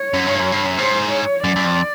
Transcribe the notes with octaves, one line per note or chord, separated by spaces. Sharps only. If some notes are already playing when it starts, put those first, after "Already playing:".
Already playing: C#5
F#2
G2
F#2
G2
F#2
G#2 C5
C#5
F#2 D5
F#2
F2